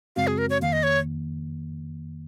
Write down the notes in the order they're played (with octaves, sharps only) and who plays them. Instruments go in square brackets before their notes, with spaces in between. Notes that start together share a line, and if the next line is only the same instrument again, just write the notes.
[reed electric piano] F#2 C#3 G#3 C4 F#4 [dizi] F5
[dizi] G#4
A#4
C#5
[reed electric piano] F2 D#3 A#3 [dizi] F5
[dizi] D#5
C#5